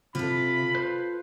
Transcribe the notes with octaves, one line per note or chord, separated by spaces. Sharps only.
C3 F4 A4 B5
B4 C5